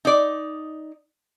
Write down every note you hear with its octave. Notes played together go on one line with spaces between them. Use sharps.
D#4 D5